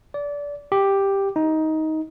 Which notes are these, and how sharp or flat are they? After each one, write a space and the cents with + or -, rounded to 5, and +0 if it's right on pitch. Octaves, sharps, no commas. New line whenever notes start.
D5 -25
G4 +5
D#4 +15